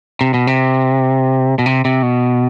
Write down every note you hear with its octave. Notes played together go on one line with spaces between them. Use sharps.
C3
B2
C3
B2
C3
C3
B2